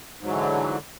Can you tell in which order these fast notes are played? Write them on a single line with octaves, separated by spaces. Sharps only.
G#2 F#3 E3 D3